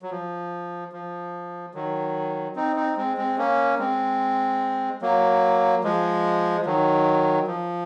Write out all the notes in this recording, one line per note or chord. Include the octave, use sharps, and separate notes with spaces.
F#3
F3
F3
D#3 F#3
C4 D#4
C4 D#4
G#3 C4
G#3 C4
A#3 C#4
G#3 C4
F#3 A#3
F3 G#3
F3
D#3 F#3
F3